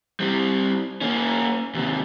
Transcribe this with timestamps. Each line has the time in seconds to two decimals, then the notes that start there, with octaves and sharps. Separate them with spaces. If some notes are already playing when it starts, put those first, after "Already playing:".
0.20 G3 C4
1.01 A#3 C#4
1.74 D#2 C3